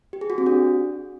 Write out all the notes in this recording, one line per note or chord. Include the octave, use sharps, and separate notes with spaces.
G4
G#4
F#4
C4
D4